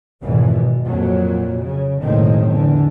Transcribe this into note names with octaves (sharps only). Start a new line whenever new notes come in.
G#1 F2 G#2 B2 E3
B2
F2 A#2 F#3
C#3
F#1 B1 A2 D#3 G#3 C4
E2 D3